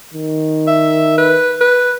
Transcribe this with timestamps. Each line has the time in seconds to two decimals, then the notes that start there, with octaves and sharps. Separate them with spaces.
0.14 D#3
0.67 E5
1.18 B4
1.61 B4